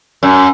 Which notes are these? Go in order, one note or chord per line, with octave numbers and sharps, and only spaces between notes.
F#2